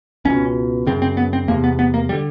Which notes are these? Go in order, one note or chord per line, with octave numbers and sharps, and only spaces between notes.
C#2 B2 C#4
F#2 C#3 C4
C4
B3
C4
E2 C3 A#3
B3
B3
A#3
G3
D3